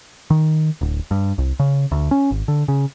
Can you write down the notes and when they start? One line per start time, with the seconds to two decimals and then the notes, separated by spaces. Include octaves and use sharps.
0.30 D#3
0.81 D1
1.11 G2
1.38 C2
1.60 C#3
1.92 D2
2.11 C#4
2.31 G#1
2.48 D3
2.68 C#3